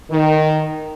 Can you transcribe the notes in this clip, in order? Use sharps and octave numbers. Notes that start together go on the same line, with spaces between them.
D#3